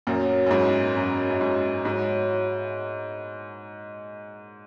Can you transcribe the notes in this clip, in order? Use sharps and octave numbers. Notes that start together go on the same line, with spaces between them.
F#2 A#2 F#3
F#2
G#2 B3 E4
F#2 F#3
F#2
G#2 B3 E4
G#2 F#3
B3 E4